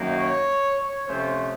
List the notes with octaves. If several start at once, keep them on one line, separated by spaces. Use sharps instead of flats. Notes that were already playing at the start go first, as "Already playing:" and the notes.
Already playing: F#2 D#3 A#3
C#5
C#5
C3 F3 A3 C#4 C5